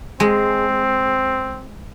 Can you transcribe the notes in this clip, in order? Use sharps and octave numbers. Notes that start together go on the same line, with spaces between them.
G#3 C4